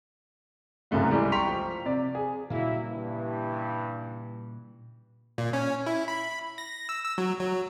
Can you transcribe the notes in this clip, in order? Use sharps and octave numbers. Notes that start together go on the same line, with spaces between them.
C2 F#2 C#3 A3 B3
E3 G3 G#3
G5 A#5 C6 C#6 B6 F7
F3
C3 D5
G#4
A#2 C#3 F#3 G3 A#3 E4
G2 E3
A#2
C#4
E4
B5
A#6
E6
E6
F#3
F#3